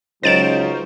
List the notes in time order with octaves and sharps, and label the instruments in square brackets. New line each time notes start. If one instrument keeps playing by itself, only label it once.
[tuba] C#2 [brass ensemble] F#3 [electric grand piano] C#4 D#4 C5 [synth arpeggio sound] A6 D7 E7